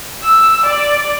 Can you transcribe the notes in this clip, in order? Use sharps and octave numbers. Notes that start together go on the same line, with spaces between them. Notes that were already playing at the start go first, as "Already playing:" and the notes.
E6
D5